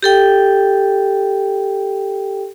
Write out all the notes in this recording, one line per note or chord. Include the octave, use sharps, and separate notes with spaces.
G4 A4 G5